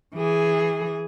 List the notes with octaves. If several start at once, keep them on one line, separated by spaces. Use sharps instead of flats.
E3 G#4